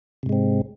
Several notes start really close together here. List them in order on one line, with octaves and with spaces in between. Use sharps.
C3 G#2 G#3 C4